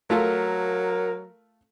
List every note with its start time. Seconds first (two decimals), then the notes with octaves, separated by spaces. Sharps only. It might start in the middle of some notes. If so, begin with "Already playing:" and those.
0.10 F#3 A3 F4 A4 A#4